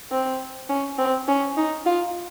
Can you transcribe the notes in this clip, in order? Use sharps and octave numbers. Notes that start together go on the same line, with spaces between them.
C4
C#4
C4
C#4
D#4
F4